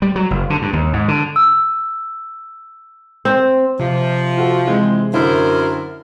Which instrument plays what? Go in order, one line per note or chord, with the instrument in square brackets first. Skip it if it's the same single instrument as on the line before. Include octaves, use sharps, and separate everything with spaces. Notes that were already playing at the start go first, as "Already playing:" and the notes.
[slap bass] G3
F#3
F#1
D3
G2
D#2
G#2
D3
[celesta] E6
[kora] C4
[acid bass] C3 [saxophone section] F3
[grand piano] F4 F#4 A4
E3 G#3 C4
[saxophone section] F#2 A#4 C5 [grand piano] D3 E4